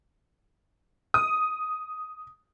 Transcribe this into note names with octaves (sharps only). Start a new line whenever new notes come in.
D#6